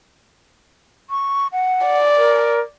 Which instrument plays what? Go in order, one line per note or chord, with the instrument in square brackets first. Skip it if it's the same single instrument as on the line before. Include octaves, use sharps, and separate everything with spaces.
[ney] C#6
F#5
[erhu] D5
[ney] A#4